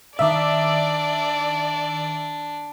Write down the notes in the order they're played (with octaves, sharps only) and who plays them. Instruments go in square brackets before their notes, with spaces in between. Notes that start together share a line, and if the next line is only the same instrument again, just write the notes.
[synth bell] D#3 E6 [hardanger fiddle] D4 [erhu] D5 [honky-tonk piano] E5 D6